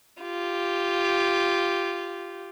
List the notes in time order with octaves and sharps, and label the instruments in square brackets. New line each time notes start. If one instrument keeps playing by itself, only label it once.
[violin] F4 G4